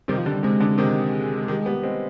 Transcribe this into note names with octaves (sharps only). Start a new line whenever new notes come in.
C3 D#3 G3
F3
D3 G3
C3 G#3
D3
C3 D#3
D#3 G3
G3 B3
G#3 C4